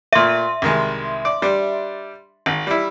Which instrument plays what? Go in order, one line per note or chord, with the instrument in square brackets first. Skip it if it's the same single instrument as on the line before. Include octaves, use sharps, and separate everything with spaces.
[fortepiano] A#2 A3 [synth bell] E5 C6
[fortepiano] C2 D#3 G#3
D5
G3 D4
G#1
G3 E4